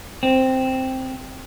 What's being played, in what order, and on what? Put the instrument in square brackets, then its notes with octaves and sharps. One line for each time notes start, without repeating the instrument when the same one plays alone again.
[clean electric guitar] C4